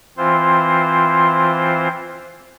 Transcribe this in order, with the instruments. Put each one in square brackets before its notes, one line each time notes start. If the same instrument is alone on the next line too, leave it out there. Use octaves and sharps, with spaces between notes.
[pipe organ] E3 C4 F4 C5